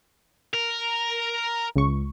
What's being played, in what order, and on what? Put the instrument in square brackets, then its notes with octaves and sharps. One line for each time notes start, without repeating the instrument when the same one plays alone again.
[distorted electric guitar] A#4
[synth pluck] C#2 C#6